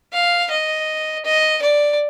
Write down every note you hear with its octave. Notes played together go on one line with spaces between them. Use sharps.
F5
D#5
D#5
D5